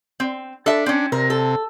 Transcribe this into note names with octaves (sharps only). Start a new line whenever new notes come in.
C4
D4 A4 E5
C4 C#4
C3 A#4
A4